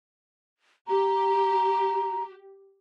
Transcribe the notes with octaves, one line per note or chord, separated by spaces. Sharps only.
G4 A#5